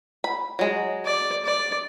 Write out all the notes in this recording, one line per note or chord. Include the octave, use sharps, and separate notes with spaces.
B5
F#3 G#3
D5
D5